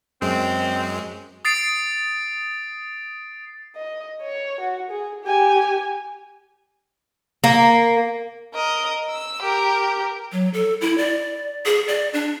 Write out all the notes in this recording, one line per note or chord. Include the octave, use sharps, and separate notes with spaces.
F#2 G#3 C4
D#6 A6 C7 D7
D#5
C#5
F#4
G#4
G4 G#5
A#3
A#4 D#5
E6
G4 A#4
F#3
A4
E4
D5
G#4
D5
D4